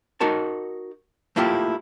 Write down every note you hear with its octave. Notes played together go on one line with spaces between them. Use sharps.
D#4 F#4 A#4 A5
A3 A#3 E4 F4 G4